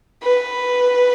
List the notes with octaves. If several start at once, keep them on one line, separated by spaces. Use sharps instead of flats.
B4